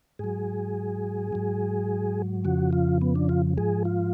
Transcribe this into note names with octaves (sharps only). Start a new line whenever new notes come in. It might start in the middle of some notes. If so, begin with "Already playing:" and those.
G#2 F#3 G#4
G#2 F#3
F2 C#3 F3 F#4
F4
B3
D4
F4
G#2 F3 G#4
F4